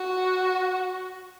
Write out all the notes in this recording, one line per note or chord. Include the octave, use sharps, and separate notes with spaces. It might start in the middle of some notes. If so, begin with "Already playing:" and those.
Already playing: F#4